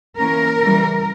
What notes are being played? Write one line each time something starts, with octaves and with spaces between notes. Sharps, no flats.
E3 A#3 C#4 A#4
C#3 E3 G3